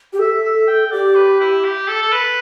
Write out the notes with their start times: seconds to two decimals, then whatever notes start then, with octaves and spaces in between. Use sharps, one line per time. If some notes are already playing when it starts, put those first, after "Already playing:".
0.13 G4
0.19 A4 E5
0.44 E5
0.67 G5
0.91 G4 D5
1.15 B4
1.41 E4
1.64 G4
1.88 A4
2.02 A4
2.12 B4